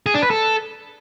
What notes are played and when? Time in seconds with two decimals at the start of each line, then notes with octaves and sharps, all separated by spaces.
0.06 G#4
0.14 D4
0.22 B4
0.30 A4